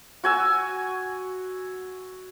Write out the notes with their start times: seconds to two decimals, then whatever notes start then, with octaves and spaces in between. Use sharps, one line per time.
0.24 F#4 G#5 E6